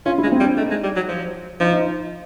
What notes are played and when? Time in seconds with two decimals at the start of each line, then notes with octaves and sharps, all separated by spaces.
0.05 C#4 F4
0.18 E4
0.23 G#3
0.32 C4
0.40 G3
0.44 D4
0.57 A3 D#4
0.70 G#3
0.83 G3
0.96 F#3
1.08 F3
1.60 F3 D#4
1.72 D#4